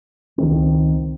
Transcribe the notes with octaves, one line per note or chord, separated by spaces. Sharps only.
C#2 D#3 C4